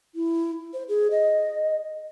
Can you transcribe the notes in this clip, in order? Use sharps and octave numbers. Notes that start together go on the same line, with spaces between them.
E4
C5
G#4
D#5